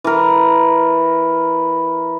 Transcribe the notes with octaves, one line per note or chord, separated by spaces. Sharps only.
E3 A#4